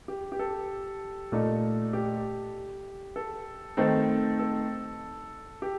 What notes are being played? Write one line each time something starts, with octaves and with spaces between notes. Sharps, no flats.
G4
G4
A4
A#2 A3 D#4
G4
A4
D#3 A3 C4 D#4 A4
A4
G4